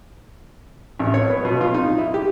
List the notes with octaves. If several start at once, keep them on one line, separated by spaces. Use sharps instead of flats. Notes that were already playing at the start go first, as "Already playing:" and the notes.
A1
C#5
B3
B2
F4
D#4
E4
G4